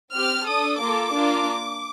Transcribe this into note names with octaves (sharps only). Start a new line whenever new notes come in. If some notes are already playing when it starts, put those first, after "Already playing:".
C4 G4 F6
D4 A4 D#6
A#3 F4 A4 D6
A#3 D4 F4